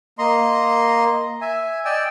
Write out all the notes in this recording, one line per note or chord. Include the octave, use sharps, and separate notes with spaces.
A#3 D#5 A#5 C6
E5 G#5
D5 D#5 G5 G#5 E6